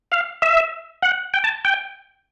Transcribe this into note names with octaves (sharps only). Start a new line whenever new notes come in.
F5
E5
F#5
G5
A5
G5